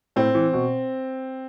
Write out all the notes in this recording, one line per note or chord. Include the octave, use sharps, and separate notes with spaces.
A2 C4
E3
B2